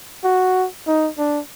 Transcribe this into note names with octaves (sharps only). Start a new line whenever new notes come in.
F#4
D#4
D4